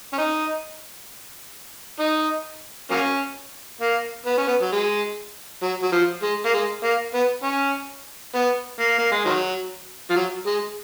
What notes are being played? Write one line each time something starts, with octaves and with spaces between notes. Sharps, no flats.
C#4
D#4
D#4
F#3 A#3 C#4
A#3
B3
C#4
B3
F#3
G#3
F#3
F#3
F3
G#3
A#3
G#3
A#3
B3
C#4
B3
A#3
A#3
G#3
D#3 F#3
F3
F#3
G#3